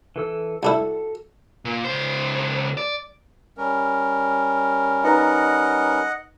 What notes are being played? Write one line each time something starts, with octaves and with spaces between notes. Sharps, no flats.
E3 A4 E6
C2 D4 E4 F#4 A4
A#2
C#2 C5
D5
G3 C#4 A#4
D#4 B4 D#5 F#5 A#5